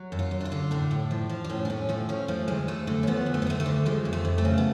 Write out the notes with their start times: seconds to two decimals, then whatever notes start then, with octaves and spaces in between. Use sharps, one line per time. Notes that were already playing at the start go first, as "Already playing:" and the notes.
Already playing: F#3
0.12 F#2
0.19 F4
0.31 F#2
0.41 D4
0.45 F4
0.52 D3
0.71 A2 D4
0.91 A2
1.11 F3
1.29 F3
1.44 D4
1.49 A2 C#4
1.65 D4
1.70 A2 C#4
1.89 F3 A3
2.09 F3 C#4
2.28 F3 A3
2.48 D2 G#3
2.68 D2 A3
2.87 D3 A3
3.03 C#4
3.07 F3 B3
3.26 D2
3.34 A3
3.42 B3
3.47 D2 A3
3.60 A3
3.66 D3
3.86 F3 G#3
4.05 F2
4.13 A3
4.25 F2
4.38 A3
4.45 C#3
4.58 B3